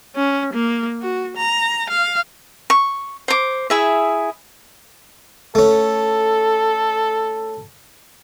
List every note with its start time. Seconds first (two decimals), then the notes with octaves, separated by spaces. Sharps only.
0.16 C#4
0.54 A#3
1.02 F#4
1.37 A#5
1.90 F5
2.70 C#6
3.28 C5 D6
3.70 E4 G#4 E5
5.55 A3 C#4 A4